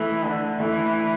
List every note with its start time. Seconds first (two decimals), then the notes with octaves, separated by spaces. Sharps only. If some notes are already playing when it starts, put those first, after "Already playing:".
Already playing: E3 A3
0.23 D3
0.60 E3 A3